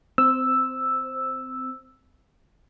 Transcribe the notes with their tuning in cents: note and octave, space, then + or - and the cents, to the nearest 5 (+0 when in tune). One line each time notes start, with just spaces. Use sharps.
C4 -25 C5 +5 E6 +0